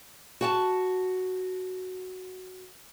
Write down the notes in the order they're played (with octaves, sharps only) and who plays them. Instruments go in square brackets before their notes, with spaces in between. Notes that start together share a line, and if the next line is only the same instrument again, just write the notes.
[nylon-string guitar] F#4 G5 A5